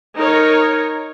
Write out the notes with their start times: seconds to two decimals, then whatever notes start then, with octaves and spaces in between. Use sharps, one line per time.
0.17 D#4 A#4 C#5